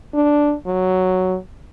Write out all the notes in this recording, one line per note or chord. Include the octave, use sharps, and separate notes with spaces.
D4
F#3